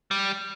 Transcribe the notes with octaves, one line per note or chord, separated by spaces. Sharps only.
G3